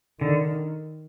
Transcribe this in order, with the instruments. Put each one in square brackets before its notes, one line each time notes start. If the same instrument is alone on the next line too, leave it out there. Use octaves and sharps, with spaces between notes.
[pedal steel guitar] D3 [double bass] D#3